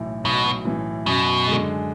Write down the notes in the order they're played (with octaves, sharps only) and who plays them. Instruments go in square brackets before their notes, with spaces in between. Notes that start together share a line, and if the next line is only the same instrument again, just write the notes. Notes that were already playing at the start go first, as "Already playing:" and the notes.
Already playing: [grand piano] B1 A2 E3
[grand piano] B1 [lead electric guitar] B2
[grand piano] A2 E3
[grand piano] F#2 [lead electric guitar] B2
[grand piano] D3 G#3